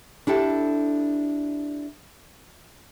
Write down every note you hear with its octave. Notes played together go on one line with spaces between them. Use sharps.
D4 E4 G4 A4